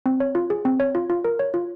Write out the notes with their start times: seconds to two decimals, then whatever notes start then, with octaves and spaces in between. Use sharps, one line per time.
0.06 C4
0.20 C#5
0.35 F4
0.50 G#4
0.65 C4
0.80 C#5
0.95 F4
1.10 F4
1.25 A#4
1.39 C#5
1.54 F4